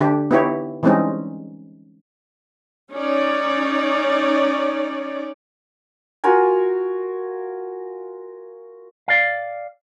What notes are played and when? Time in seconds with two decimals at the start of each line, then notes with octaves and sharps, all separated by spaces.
0.01 D3 D4 G4
0.31 B3 D#4 E4 G4 C#5
0.83 E3 G3 G#3 C4 C#4 D#4
2.92 C#4 D#4 C#5 D5
6.24 F4 F#4 A#4 G#5
9.08 D5 F5